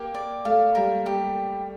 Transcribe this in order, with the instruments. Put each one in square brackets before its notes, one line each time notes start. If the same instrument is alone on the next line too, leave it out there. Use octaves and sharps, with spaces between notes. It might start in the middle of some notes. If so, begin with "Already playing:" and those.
Already playing: [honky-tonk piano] A#3 [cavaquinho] G4
[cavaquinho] D5
[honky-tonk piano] A3 [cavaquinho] F5
[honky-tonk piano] G3 [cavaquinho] A#4
[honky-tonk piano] G3 [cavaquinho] G4